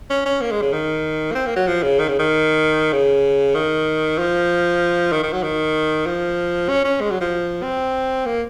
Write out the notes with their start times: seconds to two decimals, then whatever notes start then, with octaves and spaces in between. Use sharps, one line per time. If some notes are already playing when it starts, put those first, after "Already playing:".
0.10 C#4
0.26 C#4
0.41 A#3
0.51 G#3
0.62 C#3
0.72 D#3
1.31 A#3
1.35 C4
1.46 A#3
1.56 F#3
1.67 F3
1.83 C#3
1.99 D#3
2.08 C#3
2.19 D#3
2.92 C#3
3.55 D#3
4.19 F3
5.12 D#3
5.23 D#3
5.33 F#3
5.43 D#3
6.06 F3
6.69 C#4
6.84 C#4
7.00 G#3
7.11 F#3
7.21 F3
7.63 C4
8.26 A#3